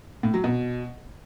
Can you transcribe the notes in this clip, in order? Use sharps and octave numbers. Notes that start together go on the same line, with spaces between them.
A2
F#3
B2